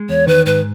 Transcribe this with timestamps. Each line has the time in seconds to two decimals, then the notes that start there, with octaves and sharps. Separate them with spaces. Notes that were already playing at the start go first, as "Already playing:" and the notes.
Already playing: G#3
0.09 E2 C#5
0.27 D#3 B4
0.46 G#2 B4